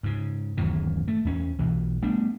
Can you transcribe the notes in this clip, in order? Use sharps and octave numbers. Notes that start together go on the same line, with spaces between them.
G#2 C#3
D1 F#2 D#3 E3
A3
E2 C#4
B1 E3
G3 A3 B3 D4